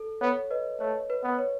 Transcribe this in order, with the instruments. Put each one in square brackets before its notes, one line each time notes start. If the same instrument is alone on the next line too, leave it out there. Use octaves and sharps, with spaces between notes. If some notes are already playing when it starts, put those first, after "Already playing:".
Already playing: [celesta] A4
[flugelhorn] B3 [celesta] C#5
[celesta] B4 D#5
[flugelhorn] A3 [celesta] C#5
[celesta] B4
[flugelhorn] B3
[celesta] B4
C#5